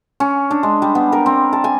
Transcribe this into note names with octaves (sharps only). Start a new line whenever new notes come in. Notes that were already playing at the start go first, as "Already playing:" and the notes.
C#4
D4
G#3
G3
B3
A#4
C4
A5
G#5